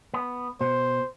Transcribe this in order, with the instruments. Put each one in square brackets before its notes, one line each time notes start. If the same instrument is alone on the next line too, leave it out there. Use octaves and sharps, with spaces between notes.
[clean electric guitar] B3
[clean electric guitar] B2 [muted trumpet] C5